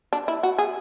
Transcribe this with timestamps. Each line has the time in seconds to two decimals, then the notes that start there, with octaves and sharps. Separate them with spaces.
0.13 D4
0.28 E4
0.43 F#4
0.58 G#4